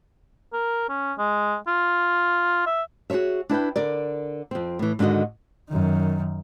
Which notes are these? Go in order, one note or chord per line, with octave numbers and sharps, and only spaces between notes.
A#4
C#4
G#3
F4
E5
F#4 G#4 A#4 C#5 E5
D4 E4 B4 G5
D3 A#4 D5
F2 C4
A2 E3
G#2 D3 D#3 F#4 D#5
F#2 D#3